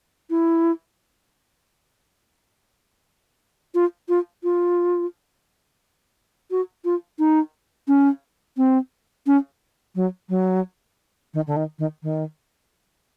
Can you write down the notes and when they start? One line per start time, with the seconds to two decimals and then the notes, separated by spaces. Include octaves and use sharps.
0.30 E4
3.74 F4
4.09 F4
4.43 F4
6.51 F#4
6.85 F4
7.19 D#4
7.88 C#4
8.57 C4
9.27 C#4
9.95 F#3
10.29 F#3
11.34 D#3
11.47 D3
11.56 D#3
11.79 D#3
12.03 D#3